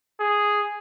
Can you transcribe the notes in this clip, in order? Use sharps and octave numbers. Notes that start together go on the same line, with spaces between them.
G#4